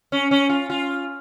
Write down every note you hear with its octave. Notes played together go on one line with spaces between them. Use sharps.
C#4
C#4
F4
F4